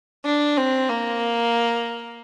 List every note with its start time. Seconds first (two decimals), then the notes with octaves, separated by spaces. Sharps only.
0.25 D4
0.57 C4
0.89 A#3